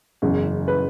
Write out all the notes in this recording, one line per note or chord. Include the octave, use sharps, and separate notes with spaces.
F#1 E2 C#3 F#3
B4